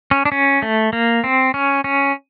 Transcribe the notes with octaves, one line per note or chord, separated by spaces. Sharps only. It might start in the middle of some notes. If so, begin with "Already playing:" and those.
C#4
D4
C#4
A3
A#3
C4
C#4
C#4